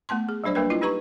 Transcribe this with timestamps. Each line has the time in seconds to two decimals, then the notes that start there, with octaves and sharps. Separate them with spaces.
0.09 A3 B3 A5 C6
0.29 G#4
0.44 F#3 G3 D4 C5 D5
0.55 G3 A#3 D4 A#4 B4
0.70 E4 F4 D#5
0.81 D#4 G4 B4 A#5 C#6